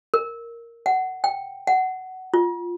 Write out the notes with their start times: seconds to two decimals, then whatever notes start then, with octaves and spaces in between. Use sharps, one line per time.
0.14 A#4
0.86 F#5
1.24 G5
1.67 F#5
2.34 F4